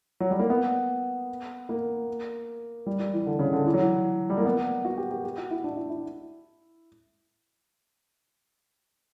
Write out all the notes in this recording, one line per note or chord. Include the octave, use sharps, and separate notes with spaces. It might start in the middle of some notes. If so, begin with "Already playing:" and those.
F#3
G3
A#3
B3
A#3
G3
G3
E3
D3
C#3
D3
E3
F#3
E3
G3
A#3
B3
F#4
G4
G4
G4
F#4
E4
D4
E4
E4